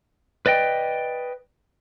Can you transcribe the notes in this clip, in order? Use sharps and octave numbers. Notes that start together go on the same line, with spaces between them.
B4 D5 D#5 G5